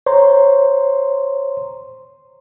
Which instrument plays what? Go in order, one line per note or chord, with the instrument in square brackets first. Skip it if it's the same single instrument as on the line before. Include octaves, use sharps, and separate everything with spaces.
[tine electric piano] C5 C#5 A#5 C6